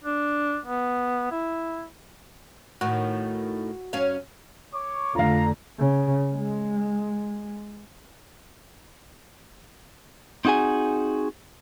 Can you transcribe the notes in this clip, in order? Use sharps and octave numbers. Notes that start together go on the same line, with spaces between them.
D4
B3
E4
A2 D#3 F#4
F#2 C#4 F5
C#5 C#6 D6
F2 D3 A3 F4 F5 A#5
C#3
G#3
C4 D#4 F#4 G#4 G#5